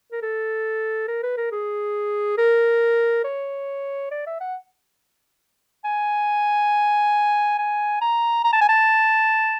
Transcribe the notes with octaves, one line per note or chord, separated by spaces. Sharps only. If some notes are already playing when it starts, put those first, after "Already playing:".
A#4
A4
A#4
B4
A#4
G#4
A#4
C#5
D5
E5
F#5
G#5
G#5
A#5
A#5
A5
G#5
A5